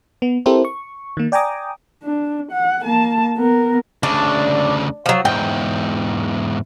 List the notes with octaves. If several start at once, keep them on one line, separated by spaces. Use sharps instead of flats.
B3
C4 E4 G4 A4 A#4 C5
C#6
D#3 A#3
D5 G5 G#5 A#5 D6 D#6
D4
F#5
A#3 A5
B3 A#4
D2 C#3 D4
F3 F#3
E2 G#2 G5